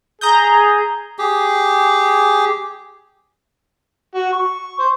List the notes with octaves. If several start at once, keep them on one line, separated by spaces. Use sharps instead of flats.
G#4 A#5 D#6 G6
G4 G#4
F#4
C#6
C5